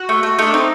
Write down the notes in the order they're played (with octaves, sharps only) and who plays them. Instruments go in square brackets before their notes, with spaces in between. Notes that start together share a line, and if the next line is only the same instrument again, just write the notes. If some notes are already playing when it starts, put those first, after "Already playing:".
Already playing: [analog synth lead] F#4
[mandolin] A3
A3
[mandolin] A3 [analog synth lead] D#4
[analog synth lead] D4
[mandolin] C4 [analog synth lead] D#4